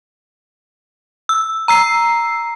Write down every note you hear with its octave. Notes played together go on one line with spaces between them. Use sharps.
E6
A#5 E6 C7